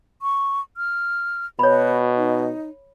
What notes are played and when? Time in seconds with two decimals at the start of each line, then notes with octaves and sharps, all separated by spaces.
0.22 C#6
0.77 F6
1.59 B2 F#4 C#5 B5
2.16 D#4